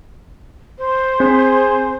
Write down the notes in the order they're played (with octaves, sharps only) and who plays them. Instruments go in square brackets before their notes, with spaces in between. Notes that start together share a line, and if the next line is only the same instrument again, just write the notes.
[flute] C5
[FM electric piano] C4 [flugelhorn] G#4